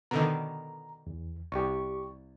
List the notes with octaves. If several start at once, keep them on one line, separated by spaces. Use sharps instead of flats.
B2 D3 D#3 A#5
E2
C2 G4 C#6